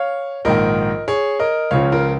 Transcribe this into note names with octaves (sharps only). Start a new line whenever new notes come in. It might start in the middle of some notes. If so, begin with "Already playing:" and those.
Already playing: C#5 F5
A#1 G#2 D#3 A#4 D#5
G#4 C#5
A#4 D#5
C#2 C#3 F3 C#5 F5
F4 A#4